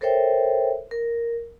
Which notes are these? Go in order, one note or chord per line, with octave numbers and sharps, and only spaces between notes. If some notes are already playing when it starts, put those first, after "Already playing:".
A4 A#4 C5 C#5 E5 G5
A#4